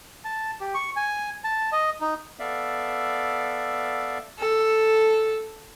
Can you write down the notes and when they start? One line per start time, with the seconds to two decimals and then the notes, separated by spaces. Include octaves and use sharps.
0.25 A5
0.61 G4
0.74 C#6
0.96 G#5
1.44 A5
1.72 D#5
2.01 D#4
2.39 B3 A4 D5 E5 F5
4.39 A4